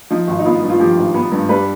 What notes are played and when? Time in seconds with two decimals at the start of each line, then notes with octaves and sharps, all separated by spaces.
0.10 F3 D#4
0.28 G#1
0.39 D#4
0.45 B3 F4
0.63 G2
0.70 F4
0.80 F3 G4
0.97 G#1
1.14 B3
1.32 G2
1.49 G3 B4